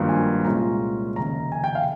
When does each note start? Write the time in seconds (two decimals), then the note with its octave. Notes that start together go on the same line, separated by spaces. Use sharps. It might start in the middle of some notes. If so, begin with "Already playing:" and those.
Already playing: G#1 G2 F3 A#3 F4
0.09 G#5
0.44 C2 A#2 G#3 C#4 F4 A#5
1.15 F1 D#2 C#3 A#5
1.52 G#5
1.64 G5
1.75 F5